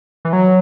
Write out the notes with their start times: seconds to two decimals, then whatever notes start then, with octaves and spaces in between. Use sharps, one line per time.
0.25 E3
0.33 F#3